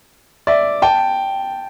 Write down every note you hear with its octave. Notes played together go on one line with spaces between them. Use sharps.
D5 E5
G5 A5